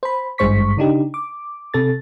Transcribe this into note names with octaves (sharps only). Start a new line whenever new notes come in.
C5 B5
G#1 G2 G#3 C5 C#6 B6
C#3 D4 D#4 G4
D6
C3 A4 A6